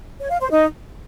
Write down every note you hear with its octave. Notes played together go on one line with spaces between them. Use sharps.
C#5
F5
C5
D#4